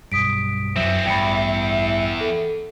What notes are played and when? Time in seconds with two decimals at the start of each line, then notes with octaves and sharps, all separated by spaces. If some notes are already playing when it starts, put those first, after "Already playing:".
0.12 B1 G2 D#6 B6 D7
0.76 F#2 E3 F#3 C4 E5
1.06 A1 E2 G2 G5 B5
2.21 A4